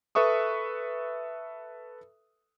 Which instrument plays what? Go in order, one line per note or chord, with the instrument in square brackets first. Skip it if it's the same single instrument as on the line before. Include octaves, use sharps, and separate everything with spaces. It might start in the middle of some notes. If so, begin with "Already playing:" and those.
[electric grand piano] A4 B4 E5 C#6 D#6